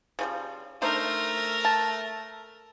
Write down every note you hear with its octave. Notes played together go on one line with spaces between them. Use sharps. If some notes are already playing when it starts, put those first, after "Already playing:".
C#3 F3 G3
A3 D4 D#4 A#4 C5
A5